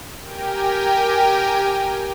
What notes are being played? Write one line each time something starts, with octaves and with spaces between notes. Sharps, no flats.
G4 A#4 G5 G#5